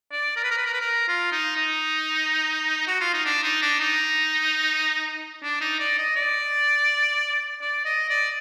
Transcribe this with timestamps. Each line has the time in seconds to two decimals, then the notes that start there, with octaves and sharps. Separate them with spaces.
0.12 D5
0.36 A#4
0.44 B4
0.51 A#4
0.58 B4
0.66 A#4
0.73 B4
0.81 A#4
1.08 F4
1.32 D#4
1.57 D#4
2.87 F#4
3.01 F4
3.13 D#4
3.25 D4
3.43 D#4
3.62 D4
3.80 D#4
5.43 D4
5.61 D#4
5.80 D5
5.98 D#5
6.16 D5
7.62 D5
7.85 D#5
8.10 D5